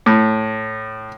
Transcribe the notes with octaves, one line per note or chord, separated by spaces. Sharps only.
A2